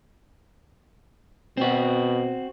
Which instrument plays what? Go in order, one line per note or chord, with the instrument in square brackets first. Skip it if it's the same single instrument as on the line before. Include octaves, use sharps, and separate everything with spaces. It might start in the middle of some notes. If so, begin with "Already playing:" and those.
[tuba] B2 [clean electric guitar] C4 F#4